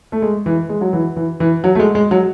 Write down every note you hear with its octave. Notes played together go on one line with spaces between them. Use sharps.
A3
G#3
E3
G#3
F#3
E3
E3
E3
F#3
A3
G#3
G#3
F#3